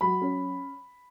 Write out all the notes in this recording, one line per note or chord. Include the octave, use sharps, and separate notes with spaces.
F#3 B5
C#4